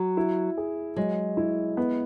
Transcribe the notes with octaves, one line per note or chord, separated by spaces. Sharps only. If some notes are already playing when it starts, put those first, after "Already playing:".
Already playing: F#3
E4
G#4
F#3 G#3
E4
B3